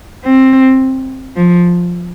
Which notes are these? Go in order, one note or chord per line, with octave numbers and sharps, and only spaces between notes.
C4
F3